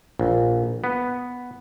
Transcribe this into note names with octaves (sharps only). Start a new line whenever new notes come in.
A#1
B3